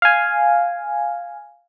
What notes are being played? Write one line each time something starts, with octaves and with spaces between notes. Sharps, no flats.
F5 G#5